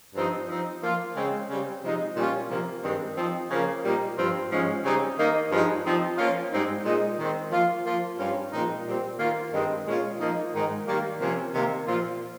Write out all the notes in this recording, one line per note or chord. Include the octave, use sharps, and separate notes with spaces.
G2 F3 C4 D#4
F3 C4 D#4
F3 A#3 F4
C#3 G#3 C4
C#3 G3 C4
C3 F3 G#3 D#4
A#2 G3 C#4 F4
C3 F3 A#3
G2 D#3 G#3 C4
F3 C4 D#4
C#3 F3 A#3
A#2 G3 A#3 D#4
G2 F3 C4 F4
G#2 F3 G#3 C#4
C#3 G3 C4 D#4
D#3 A#3 D#4
G2 F3 G#3 D#4
F3 C4 D#4
F3 A#3 C#4 F4
G#2 G3 C4 D#4
A#2 G#3 D#4
D#3 G#3 C4
F3 A#3 F4
F3 A#3 F4
G2 G3 C#4 F4
A#2 F3 G#3 C4 D#4
A#2 G3 C4
D#3 A#3 F4
G2 D#3 G#3 C4 D#4
A#2 G#3 C#4 F4
F3 A#3 D#4
G#2 D#3 G#3 D#4
D#3 G3 A#3
C3 F3 A#3 C#4
C3 D#3 A#3
A#2 F3 C4 F4